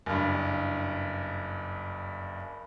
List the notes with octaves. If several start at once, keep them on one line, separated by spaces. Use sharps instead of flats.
F#1 G2